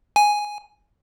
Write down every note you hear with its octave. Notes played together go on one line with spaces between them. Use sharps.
G#5